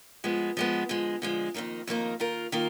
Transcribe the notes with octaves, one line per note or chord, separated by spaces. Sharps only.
F3 G#3 B3
F3 G#3 B3
D3 F3 G#3
D3 F3 G#3
F2 D#3 A#3 D#4
F2 D#3 A#3 D#4
D#3 A#3 F4 A#4
D#3 A#3 F4 A#4